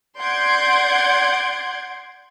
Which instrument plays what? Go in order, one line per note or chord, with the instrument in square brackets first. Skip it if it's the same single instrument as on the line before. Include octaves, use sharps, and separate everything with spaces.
[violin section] D5 F#5 C6 G6 G#6 D7